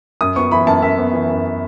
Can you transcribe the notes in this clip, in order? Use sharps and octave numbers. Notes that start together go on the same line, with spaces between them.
F#2 D#6
B3 C#6
E3 B5
F#2 A5
F#2 E5
B3
E3
F#2